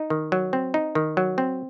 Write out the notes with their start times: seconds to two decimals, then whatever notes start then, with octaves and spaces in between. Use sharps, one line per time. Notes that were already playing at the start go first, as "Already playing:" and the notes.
Already playing: D#4
0.10 D#3
0.32 F#3
0.53 C4
0.74 D#4
0.95 D#3
1.17 F#3
1.38 C4